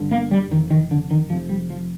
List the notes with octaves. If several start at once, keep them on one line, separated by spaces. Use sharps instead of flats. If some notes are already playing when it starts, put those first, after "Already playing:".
Already playing: G1 G2 D3
A#3
G3
F1 F2 C3 D#3
D#3
D3
D#3
F1 F2 C3 F3
G3
F3